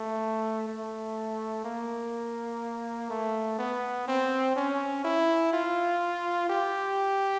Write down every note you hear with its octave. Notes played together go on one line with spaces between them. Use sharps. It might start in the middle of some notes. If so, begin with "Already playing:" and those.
Already playing: A3
A3
A#3
A3
B3
C4
C#4
E4
F4
G4